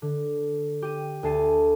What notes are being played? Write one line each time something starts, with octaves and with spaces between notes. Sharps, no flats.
D3
G4 D#7
D2 G#5 A5 C7 D#7